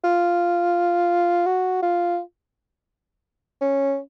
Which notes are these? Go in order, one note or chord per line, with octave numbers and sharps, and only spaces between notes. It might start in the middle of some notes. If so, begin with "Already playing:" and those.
F4
F#4
F4
C#4